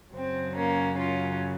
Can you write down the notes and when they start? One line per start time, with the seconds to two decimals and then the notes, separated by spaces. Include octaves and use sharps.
0.14 F#2 C#3 F#3 C4
0.56 A#3 C#4
0.97 C#4 F4